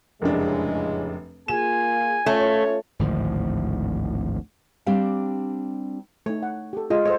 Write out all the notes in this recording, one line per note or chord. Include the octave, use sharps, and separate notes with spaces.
F1 F#2 A2 C#3 G#3 D4
A#3 F4 G#4 G#5 E7
A3 C#4 F4 C#5
G#1 D2 A2 F3
G3 C4 D4 G4 F5
A3 D#4 C#5
F#5
G4 A4
G#3 F4
A4 C5 C#5 D#5